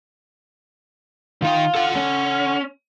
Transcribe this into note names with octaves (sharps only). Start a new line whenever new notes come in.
D#3 D#4 F4 G5
A4 F#5
C#4